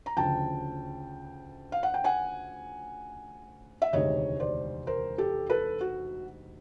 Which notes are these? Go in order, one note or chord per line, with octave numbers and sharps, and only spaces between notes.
A#5
D2 C#3 F3 G5 A5
F5
F#5
G5
F#5 G#5
E5
E1 D2 C3 D#3 G#3 C#5 D#5
C5 D5
A#4 C5
G4 A4
A4 B4
F#4